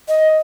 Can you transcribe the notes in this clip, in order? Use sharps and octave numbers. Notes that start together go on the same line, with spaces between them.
D#5